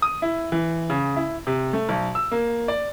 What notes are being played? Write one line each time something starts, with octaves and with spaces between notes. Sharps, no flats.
D#6
E4
E3
C#3
E4
C3
A3
B1
E6
A#3
D5